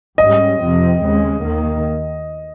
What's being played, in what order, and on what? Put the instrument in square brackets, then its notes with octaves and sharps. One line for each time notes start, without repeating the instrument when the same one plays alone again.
[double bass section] G#2 G3 C#4 [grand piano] D#5
[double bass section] F2 C3 F3 C4
D#2 C#3 G#3
D#2 D#3 A#3